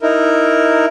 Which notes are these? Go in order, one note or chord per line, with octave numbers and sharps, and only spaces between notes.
D#4 E4 A#4